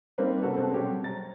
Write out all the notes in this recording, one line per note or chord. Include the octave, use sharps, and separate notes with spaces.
G3 A#3 C4 D#4 B4 C5
C3 A#3 F#4 A4 B4
B2 G#3 C4 A4
F#3 G3 C4 G4 C#5
A#5 A6